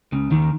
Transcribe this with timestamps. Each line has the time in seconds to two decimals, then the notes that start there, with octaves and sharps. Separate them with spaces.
0.12 C#2 C#3
0.31 D#2 D#3